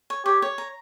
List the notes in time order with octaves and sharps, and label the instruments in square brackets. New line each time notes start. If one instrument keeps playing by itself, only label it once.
[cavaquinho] C#5
[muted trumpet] G4 [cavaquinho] C#5
[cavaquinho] C#5
A#5